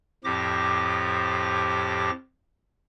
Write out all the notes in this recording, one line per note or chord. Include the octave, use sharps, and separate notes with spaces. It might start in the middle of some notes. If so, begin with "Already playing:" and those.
F2 A2 F3 G4 D6 A#6